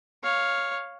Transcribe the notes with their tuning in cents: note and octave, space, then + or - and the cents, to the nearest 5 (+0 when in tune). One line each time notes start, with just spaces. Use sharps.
C#5 +0 F5 +5